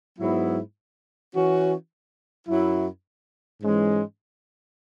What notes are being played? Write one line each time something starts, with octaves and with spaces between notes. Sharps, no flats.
G#2 F#3 B3 E4
E3 C#4 F#4
F#2 F#3 E4
G#2 E3 G#3 C#4